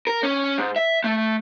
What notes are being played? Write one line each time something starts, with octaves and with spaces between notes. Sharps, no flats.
A#4
C#4
G#2
E5
A3